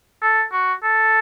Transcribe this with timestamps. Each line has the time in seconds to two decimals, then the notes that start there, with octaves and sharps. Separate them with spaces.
0.22 A4
0.52 F#4
0.83 A4